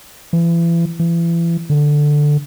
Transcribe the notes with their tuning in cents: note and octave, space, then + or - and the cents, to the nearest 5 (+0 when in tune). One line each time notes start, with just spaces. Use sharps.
E3 +35
E3 +35
D3 +5